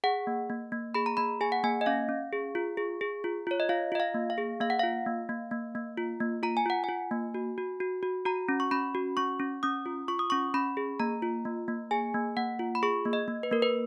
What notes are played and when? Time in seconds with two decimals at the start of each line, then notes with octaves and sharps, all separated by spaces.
0.04 G#4 F#5
0.27 A#3
0.50 A#3
0.72 A#3
0.94 G#4 B5
1.06 A#5
1.17 A#3 B5
1.41 G#4 G#5
1.52 F#5
1.64 A#3 G#5
1.81 D#5
1.86 C#4 F5
2.09 C#4
2.33 G#4
2.55 F4
2.77 G#4
3.01 G#4
3.24 F4
3.47 F4 C#5
3.60 D#5
3.69 F4 F5
3.92 F4 D#5
4.00 F5
4.14 A#3
4.30 F5
4.38 G#4
4.60 A#3 F5
4.70 F#5
4.79 F4 F5
5.06 A#3
5.29 A#3
5.51 A#3
5.75 A#3
5.98 F4
6.20 A#3
6.43 F4 A#5
6.57 G#5
6.66 F4 F#5
6.84 F4 G#5
7.11 A#3
7.34 F#4
7.58 F#4
7.80 F#4
8.03 F#4
8.25 F#4 A#5
8.49 C#4
8.60 C#6
8.71 C#4 B5
8.95 F#4
9.17 C#4 C#6
9.39 C#4
9.63 C#4 D#6
9.86 F4
10.08 F4 C#6
10.19 D#6
10.30 C#4 C#6
10.54 C#4 B5
10.77 G#4
11.00 A#3 A#5
11.22 F4
11.45 A#3
11.68 A#3
11.91 G#4 G#5
12.14 A#3
12.37 A#3 F#5
12.59 F4
12.75 B5
12.83 G#4 C#6
13.05 A#3
13.13 D#5
13.28 A#3
13.43 B4
13.51 A#3 A#4
13.62 B4